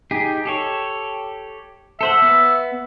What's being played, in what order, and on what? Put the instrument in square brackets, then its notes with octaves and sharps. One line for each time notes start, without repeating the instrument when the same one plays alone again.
[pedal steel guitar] D#4 G4 G#4
G4 A4 C#5
[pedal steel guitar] A4 C5 F#5 [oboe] E5
[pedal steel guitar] B3